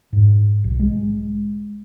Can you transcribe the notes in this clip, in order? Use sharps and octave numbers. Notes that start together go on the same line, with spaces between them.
G#2
B1
G#3